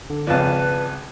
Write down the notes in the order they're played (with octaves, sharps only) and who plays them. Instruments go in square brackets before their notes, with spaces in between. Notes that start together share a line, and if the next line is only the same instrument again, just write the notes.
[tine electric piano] D3
[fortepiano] G#1 C#2 F3 [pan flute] B4 [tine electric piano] D5 A5